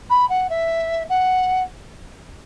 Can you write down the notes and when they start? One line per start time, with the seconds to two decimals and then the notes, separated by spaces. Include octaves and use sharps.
0.10 B5
0.29 F#5
0.50 E5
1.09 F#5